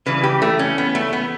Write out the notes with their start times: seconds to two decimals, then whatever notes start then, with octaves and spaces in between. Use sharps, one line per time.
0.06 C#3 E3 G3 B4
0.23 G4
0.42 A3
0.59 C#4
0.78 B3
0.95 A3
1.13 B3